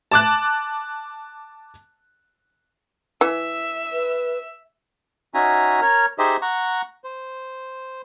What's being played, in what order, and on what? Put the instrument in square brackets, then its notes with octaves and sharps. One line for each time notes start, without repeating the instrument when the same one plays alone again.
[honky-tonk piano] A5 D6 F#6
[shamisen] E3 [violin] E5 E6
[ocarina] B4
[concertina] C#4 D#4 F#4 E5 G#5 A#5
A#4 C#5 F6
D#4 G4 G#4 C5 D#5 E5
F#5 A#5 C#6
C5